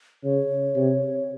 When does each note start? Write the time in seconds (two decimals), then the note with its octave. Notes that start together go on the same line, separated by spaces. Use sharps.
0.24 C#3 C#5
0.76 C3